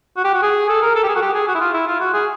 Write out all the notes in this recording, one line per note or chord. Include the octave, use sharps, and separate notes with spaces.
F#4
G4
F#4
G#4
A4
A#4
A4
G4
G#4
F#4
G4
G#4
F#4
E4
F4
E4
F4
F#4
G#4